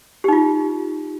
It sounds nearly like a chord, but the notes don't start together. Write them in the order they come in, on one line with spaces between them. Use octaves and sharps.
G4 D#4 F4